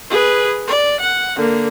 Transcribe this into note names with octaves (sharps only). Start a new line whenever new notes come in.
G#4 B4
D5
F#5
D3 A#3